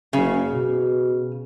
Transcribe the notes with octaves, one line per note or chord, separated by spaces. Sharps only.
F#1 C#3
B2